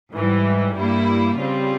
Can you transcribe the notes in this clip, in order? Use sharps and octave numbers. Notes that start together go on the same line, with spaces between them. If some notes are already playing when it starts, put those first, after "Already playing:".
G#2 E3 G3
G2 G3 A#3 E4
C#3 G3 C4 F4